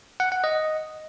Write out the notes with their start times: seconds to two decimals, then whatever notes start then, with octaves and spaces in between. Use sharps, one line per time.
0.20 F#5
0.32 F#5
0.44 D#5